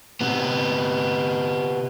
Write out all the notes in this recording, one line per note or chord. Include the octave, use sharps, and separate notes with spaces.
C3 B3